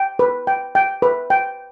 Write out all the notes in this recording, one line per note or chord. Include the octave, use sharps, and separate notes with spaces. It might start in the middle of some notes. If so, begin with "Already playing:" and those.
Already playing: G5
B4
G5
G5
B4
G5